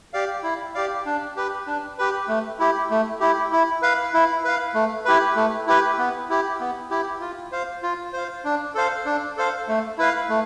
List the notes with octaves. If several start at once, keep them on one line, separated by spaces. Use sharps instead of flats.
G4 D5 F5
E4
G4 D5 F5
D4
G4 B4
D4
G4 B4
A3
E4 G4
A3
E4 G4
E4
B4 F5
E4
B4 F5
A3
E4 G4 B4
A3
E4 G4 B4
B3
E4 G4
B3
E4 G4
F4
C5 F5
F4
C5 F5
D4
A4 C5 F5
D4
A4 C5 F5
A3
E4 B4 F5
A3